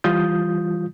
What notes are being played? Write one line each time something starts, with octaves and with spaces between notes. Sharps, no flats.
E3 G3 F4 D#6 G6